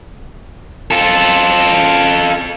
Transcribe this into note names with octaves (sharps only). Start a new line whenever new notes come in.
F4 A4